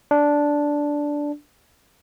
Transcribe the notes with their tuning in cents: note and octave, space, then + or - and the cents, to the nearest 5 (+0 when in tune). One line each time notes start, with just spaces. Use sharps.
D4 -5